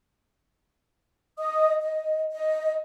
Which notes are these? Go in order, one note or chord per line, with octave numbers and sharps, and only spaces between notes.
D#5 D#6
D#5
D#5